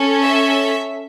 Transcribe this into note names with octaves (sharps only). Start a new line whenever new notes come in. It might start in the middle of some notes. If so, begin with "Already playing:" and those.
Already playing: C#4 A4
E5